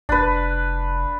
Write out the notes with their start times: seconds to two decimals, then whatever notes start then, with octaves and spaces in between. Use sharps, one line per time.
0.09 F1 D4 B4